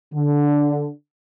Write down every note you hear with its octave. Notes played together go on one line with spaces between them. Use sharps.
D3